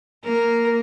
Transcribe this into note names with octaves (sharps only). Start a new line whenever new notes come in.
A#3 A#4